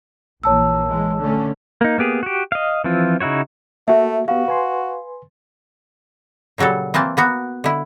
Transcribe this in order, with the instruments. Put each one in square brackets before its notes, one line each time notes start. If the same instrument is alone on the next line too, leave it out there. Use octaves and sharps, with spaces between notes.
[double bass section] A#1 E3 A#3 [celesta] C#5 A5 E6
[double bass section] E3 G#3
D3 A3 C#4
[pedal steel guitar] A#3 D#4
A#3 B3 G4 G#4
F#4 G4
D#5 F5
E3 F3 C4 F4
C#3 D#4 E4 F#4 C#5
[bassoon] A3 [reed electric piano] A#3 F#4 [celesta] E5
[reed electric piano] B3 G4 [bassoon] F#4 [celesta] F5
[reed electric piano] B4 G#5 C6
[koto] A#2 C#3 F#3 G3 A4
E3 A#3 C4 A5
A#3 B3 F#4
D3 E4